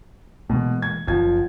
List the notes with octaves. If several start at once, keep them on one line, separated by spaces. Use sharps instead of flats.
B2 E3 G#3 A#3
G#6
F#1 F3 G#6